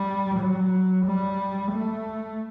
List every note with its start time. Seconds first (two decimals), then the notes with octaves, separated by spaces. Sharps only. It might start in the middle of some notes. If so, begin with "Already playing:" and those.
Already playing: G3
0.39 F#3
1.05 G3
1.72 A3